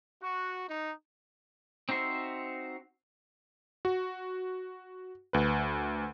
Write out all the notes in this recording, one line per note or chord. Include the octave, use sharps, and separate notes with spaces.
F#4
D#4
C4 D#4 F#4 C5 E5
F#4
D2 B4